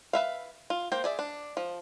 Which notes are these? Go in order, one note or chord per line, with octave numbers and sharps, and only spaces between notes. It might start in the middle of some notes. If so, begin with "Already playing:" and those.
B4 E5 F5
F4
A#3 C5 G5
G#4 D5 E5
D4
F3